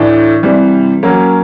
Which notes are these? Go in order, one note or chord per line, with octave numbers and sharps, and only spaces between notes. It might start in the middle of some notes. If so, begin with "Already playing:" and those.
Already playing: A2 E3 A3 D4
C3 E3 G3
F#3 A#3 C#4